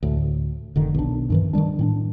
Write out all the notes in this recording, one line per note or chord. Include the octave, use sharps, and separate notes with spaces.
D2 A2
F1 D3 D#3
B1 D4
G2 D#3 E3
D#3 F3 G3 D4
A2 C4 D4